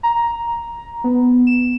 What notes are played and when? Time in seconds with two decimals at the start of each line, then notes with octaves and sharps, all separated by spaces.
0.03 A#5
1.04 B3
1.47 E7